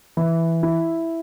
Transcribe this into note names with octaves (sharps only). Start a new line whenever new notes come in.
E3
E4